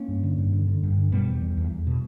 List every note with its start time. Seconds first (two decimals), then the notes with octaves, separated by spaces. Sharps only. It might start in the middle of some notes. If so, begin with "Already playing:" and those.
Already playing: A#3 C#4
0.08 G2
0.23 D3
0.38 G2
0.53 D3
0.67 D3
0.83 G2
0.98 D3
1.12 B2 G3 B3
1.27 E2
1.41 E2
1.57 E2
1.72 E2
1.87 B2